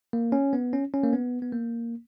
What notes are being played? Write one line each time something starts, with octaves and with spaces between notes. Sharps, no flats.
A#3
C#4
B3
C#4
C#4
A#3
B3
B3
A#3